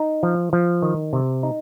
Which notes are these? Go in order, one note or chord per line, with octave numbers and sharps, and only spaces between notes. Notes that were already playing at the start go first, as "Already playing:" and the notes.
Already playing: D#4
F3
F3
D#3
C3
D#4